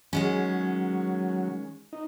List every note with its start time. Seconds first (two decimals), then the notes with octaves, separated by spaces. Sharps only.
0.13 D#3 F#3 G#3 C#4
1.93 D#4